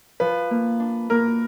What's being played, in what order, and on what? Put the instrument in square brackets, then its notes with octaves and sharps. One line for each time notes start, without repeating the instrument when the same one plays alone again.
[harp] F3 [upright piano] B4
[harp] A#3
D4
[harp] A#3 [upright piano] A#4